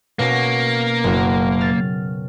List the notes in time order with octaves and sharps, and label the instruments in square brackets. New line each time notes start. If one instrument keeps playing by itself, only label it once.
[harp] B2 C#4 F#4 [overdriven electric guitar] A#3
[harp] F#1 F#4
F6 A6